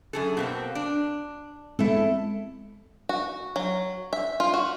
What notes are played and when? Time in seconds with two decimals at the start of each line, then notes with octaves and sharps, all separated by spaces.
0.13 F#2 G#4 A4
0.37 B2 A#3 C4
0.75 D4
1.79 G#3 B3 C4 E4 A4
3.09 F#4
3.56 F#3
4.13 E5
4.40 F4
4.54 F#4